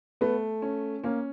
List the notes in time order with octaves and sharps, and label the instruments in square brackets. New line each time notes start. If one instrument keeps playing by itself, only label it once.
[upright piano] A3 [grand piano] B3
[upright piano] C#4
[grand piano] A#3 [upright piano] C#4